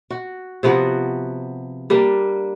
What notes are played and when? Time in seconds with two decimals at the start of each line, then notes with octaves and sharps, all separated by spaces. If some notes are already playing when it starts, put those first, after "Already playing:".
0.10 F#4
0.63 C3 F3 B3 F#4
1.90 G3 A#3 D4